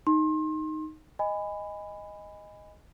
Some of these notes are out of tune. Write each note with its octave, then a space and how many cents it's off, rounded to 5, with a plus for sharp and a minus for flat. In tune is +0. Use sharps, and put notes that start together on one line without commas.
D#4 +0 C6 +30
D#5 +0 G#5 -20 B5 +20